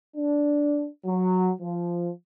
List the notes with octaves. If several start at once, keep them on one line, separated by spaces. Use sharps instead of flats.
D4
F#3
F3